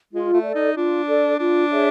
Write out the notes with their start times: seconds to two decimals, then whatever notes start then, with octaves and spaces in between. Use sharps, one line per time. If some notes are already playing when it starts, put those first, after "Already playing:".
0.12 G#3 F4
0.33 A3
0.44 A4 D5
0.55 D#4
0.76 D4 F4
1.08 A4 D5
1.39 D4 F4
1.71 G#4 C#5 E5